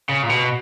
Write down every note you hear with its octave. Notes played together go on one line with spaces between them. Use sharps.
C#3
A#2
B2